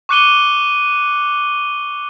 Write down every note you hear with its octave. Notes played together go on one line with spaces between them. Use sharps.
C#6 D6 F#6 C#7 D#7 G7